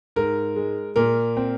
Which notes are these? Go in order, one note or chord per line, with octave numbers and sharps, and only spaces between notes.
G#2 A#4
G#3
A#2 A#4
C4